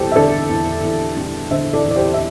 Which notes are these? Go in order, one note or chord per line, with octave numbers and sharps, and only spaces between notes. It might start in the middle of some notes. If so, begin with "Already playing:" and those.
Already playing: E2 G3 G4 A4 C5
E5
D3 A4 D5
E2
E2
G3
D3 C5 E5
A4 D5
E2
D5
G4 C5
E5